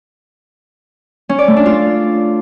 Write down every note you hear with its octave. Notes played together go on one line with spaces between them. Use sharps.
C#4
D5
A3
D4
F4